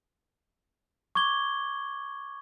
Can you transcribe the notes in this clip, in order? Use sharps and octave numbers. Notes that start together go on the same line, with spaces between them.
C#6 D6 G#6 G7